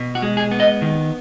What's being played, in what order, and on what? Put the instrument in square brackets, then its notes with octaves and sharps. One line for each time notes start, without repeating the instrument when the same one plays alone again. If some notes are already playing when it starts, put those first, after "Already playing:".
Already playing: [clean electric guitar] B2
F#4
G#3
G#4
B3
D#5
D#3